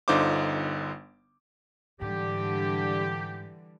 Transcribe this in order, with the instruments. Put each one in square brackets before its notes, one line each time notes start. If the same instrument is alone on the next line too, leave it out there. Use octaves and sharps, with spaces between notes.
[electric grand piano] G1 D3 D#4 F4 C5 D6
[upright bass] G#2 [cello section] D3 E3 G3 [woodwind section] G4